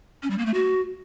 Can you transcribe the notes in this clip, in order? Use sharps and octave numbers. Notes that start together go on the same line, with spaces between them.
C#4
G3
A#3
A3
F#4